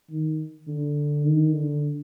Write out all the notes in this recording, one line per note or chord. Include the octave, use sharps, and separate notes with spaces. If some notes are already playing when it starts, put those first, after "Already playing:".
D#3
D3
D#3
D3